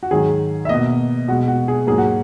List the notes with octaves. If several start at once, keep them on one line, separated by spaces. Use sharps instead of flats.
F#4
G#2 D#3 F#3 G#4
E5
B2 A#3 D#5
B2 G#3 F#4
F#4
G#4
G#2 F#3 A#3 G#4
F#4